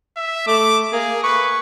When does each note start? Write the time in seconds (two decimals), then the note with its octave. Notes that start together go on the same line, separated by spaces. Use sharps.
0.17 E5
0.47 A3 D6
0.93 A#3 G#4
1.24 B4 C#6